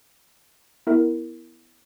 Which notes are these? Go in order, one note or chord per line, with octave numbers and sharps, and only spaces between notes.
B3 E4 A#4 E5